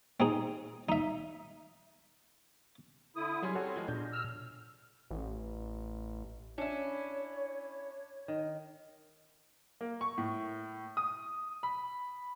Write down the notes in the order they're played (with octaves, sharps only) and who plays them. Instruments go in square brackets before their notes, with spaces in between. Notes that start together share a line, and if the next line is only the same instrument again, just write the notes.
[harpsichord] C4 D#4 G#4
D#4 E5
[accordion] D3 E4 D#6
[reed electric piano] F#3 C6 [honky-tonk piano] G3 C#4 G#4
[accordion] C4 [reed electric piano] F#4 A4 C#5
[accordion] E2 [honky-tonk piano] F3 G#3
[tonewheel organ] A#2 [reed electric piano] D4 [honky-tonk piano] G6
[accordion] E6 F6
[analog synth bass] A1
[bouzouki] C#4 E4 [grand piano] D4 [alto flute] C#5
[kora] D#3
[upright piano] A#3
C#6
A2
D#6
B5